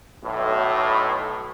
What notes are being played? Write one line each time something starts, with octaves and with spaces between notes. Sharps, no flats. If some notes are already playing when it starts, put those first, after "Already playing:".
B1 A2